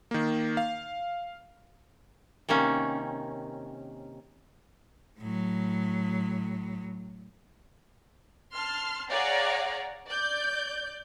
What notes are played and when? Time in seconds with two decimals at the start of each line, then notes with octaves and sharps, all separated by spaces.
0.11 D#3 A#3
0.57 F5
2.49 C3 D#3 A#3 C#4
5.18 A2 F#3
8.54 A5 C6 F6
9.09 G#4 C#5 D5 F5 F#5 A#5
10.06 D5 G6